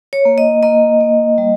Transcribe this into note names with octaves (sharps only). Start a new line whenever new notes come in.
C#5
A#3
D#5
A#3 D#5
A#3
G3